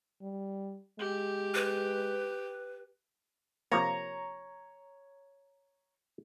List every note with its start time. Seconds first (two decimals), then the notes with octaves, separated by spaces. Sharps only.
0.22 G3
0.99 G#3 G4
1.55 B4
3.72 C3 F3 A#3 C#5 A#5